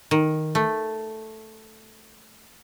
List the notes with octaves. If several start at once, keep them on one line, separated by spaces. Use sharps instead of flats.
D#3
A3